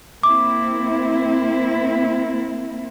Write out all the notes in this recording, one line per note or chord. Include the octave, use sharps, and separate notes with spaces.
A#3 C4 E4 D6